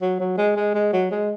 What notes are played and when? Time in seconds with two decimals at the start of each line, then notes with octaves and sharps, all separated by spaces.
0.01 F#3
0.20 F#3
0.38 G#3
0.56 G#3
0.75 G#3
0.93 F#3
1.11 G#3